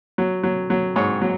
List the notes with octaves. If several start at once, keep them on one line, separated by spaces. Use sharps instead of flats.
F#3
F#3
F#3
G#2 C#5
F#3